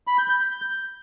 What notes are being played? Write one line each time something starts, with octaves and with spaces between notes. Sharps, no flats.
B5
G6
G6